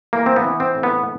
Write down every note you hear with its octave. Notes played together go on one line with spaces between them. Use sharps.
E3 A#3
C4
B3
E3
C4
A2
B3